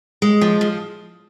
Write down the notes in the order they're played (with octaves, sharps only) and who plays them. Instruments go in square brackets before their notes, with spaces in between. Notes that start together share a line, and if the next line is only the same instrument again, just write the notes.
[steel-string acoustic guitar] G#3
F3
F3